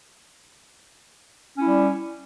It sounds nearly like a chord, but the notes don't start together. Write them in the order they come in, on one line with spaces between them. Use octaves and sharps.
C#4 E4 G3